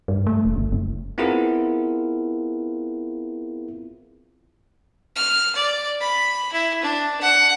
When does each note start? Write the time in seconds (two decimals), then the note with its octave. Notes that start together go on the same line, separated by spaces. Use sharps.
0.08 G2
0.27 A3
0.45 E1
0.56 G1
0.72 F#1
1.18 B3 C4 E4 F4 G#4 A#4
5.16 F6
5.56 D5
6.01 B5
6.53 E4
6.82 D4
7.20 F#5